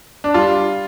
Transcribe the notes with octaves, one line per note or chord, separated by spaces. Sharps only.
D4
G3 F4